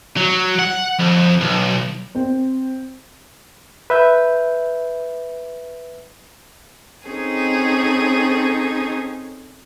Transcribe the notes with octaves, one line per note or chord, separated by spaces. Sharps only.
F#3
F#5
F2
B1
C4 C5
B4 E5 G6
C4 C#4 D#4 G#4 A4